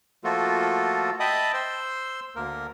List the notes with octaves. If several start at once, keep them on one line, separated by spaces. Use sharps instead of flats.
F3 A3 A#3 F4 F#4 A4
D#5 E5 G5 A5 B5 D#6
C5 C6 E6
D2 A#3 A#4